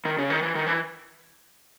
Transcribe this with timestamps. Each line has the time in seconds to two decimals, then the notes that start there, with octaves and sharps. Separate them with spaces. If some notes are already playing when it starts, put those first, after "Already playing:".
0.05 D#3
0.18 C#3
0.30 D#3
0.42 E3
0.55 D#3
0.66 E3